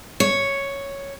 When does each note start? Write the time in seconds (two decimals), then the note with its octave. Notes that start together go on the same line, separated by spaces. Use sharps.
0.20 C#5